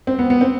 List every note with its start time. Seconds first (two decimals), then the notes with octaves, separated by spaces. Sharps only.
0.07 C4
0.19 B3
0.30 B3
0.41 C4